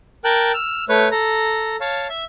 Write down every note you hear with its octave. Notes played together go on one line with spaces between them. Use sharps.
A#4 G5 A5 F#6
E6 F6
A3 B4 C#5
A4 A#5
C#5 F5 A5
E5